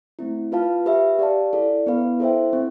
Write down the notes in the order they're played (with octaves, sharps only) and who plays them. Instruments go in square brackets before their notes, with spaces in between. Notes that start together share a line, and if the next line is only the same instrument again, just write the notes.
[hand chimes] A3 C4 E4
F4 B4 F5 A5
G4 B4 E5
G4 D5 F5 A5
E4 A4 D5
B3 E4 B4 F5
E4 A4 C5 E5 G5
C4 E4